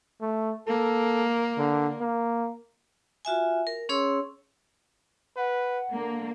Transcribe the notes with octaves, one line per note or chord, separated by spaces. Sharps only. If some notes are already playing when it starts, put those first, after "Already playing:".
A3
A#3 A4
D3
A#3
F4 F#4 E5 G#5
A#4
C#4 G#4 C#5 C6 E6
B4 F#5
D3 A#3